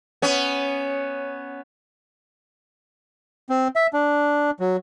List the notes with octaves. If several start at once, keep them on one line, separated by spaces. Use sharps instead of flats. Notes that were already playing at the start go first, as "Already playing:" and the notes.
B3 C#4
C4
E5
D4
F#3